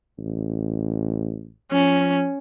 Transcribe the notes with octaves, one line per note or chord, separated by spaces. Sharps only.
A1
F3 C#4